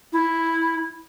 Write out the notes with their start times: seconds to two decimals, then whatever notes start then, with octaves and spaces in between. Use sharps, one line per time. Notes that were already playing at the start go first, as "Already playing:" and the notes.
0.13 E4